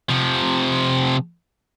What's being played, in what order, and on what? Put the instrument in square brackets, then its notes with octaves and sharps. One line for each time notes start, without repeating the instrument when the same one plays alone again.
[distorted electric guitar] C3 F3